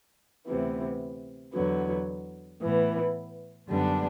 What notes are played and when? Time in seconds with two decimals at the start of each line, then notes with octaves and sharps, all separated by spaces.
0.46 D2 C3 E3 B3
1.54 E2 D3 F#3 B3
2.61 A2 E3 B3
3.68 F#2 D3 G3 B3 D4